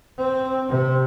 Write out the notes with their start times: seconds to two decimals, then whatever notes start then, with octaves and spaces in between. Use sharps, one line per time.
0.18 C4
0.69 C3